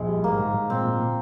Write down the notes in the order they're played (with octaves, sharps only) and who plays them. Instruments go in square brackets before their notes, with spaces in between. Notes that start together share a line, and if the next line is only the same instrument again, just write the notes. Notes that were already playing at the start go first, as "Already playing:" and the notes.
Already playing: [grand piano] A#1 [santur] G#3
[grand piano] G3
[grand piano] G#2 [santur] A#3
[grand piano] G#2
G#2
[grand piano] A#2 [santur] C4
[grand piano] A#2
A#2